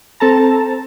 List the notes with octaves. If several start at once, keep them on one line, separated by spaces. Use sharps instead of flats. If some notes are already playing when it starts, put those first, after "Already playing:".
C4 A4 A5 A#5